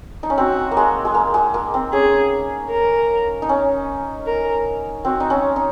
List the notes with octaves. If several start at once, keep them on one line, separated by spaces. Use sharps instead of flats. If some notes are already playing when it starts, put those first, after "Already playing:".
D#4
C#4
C4 F#4
A#3
G#3
G#3
A#3
G#3
A#3
C4
C#4 G#4
A#4
D#4
C#4
A#4
C4 F#4
D#4
C#4
D#4